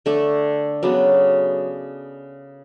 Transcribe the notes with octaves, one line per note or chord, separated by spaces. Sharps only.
D3 A3 D4
C#3 F#3 B3 D4